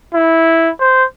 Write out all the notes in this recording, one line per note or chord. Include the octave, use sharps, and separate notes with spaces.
E4
C5